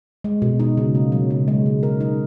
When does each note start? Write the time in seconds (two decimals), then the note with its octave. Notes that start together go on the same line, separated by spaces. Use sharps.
0.24 G#3
0.42 B2
0.60 D#4
0.77 C#3
0.95 A#3
1.12 F#3
1.30 C#3
1.48 G#3
1.66 C#3
1.83 A#4
2.01 D#4